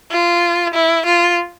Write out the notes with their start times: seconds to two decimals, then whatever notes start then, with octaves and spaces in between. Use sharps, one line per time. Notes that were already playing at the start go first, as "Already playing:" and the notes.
0.11 F4
0.74 E4
1.06 F4